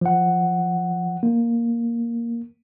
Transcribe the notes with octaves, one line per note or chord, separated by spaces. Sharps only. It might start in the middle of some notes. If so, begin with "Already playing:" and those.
F3 F#5
A#3